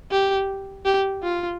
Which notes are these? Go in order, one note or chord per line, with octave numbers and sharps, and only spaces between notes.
G4
G4
F4